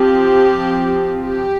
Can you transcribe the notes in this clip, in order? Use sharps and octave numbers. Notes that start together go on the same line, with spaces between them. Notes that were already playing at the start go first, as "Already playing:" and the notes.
Already playing: F3 C4 G4
G4